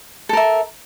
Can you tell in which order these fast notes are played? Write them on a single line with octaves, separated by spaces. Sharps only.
A4 A#4 E5